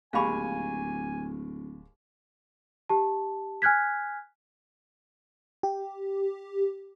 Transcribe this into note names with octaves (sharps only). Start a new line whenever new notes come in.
D1 D#2 G#3 F5 G#5 B5 C#6
G4 A5
G#5 F6 F#6 G#6 B6
G4